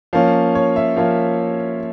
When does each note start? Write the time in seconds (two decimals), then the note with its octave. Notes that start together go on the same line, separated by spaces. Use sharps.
0.13 F3 A#3 C#4 F5
0.55 C#5
0.76 E5
0.96 F3 A#3 C#4 F5